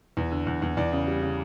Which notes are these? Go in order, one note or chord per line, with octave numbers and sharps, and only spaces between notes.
E2
D3
E2
E2
E2 D5
C#3
G3
C#3